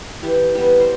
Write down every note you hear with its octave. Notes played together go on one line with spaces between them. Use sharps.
E3 G4
G3 B3 G4
C5